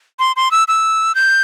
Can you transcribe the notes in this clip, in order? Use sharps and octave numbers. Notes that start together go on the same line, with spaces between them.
C6
C6
E6
E6
G6